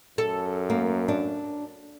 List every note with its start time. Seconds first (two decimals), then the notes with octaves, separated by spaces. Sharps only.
0.18 F#2 A4
0.70 A#3
1.08 D4